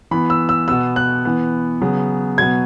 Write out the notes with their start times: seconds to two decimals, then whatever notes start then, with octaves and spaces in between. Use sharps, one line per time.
0.11 E3 B3 B5
0.30 E6
0.49 E6
0.68 B2 B3 E6
0.96 F#6
1.25 E3 B3
1.81 C#3 F#3 B3
2.38 B2 F#3 B3 G#6